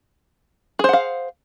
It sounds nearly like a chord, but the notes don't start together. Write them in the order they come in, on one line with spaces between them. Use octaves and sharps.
G#4 C5 F#5 F5